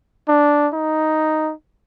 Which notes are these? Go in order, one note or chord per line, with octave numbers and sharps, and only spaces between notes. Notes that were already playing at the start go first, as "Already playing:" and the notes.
D4
D#4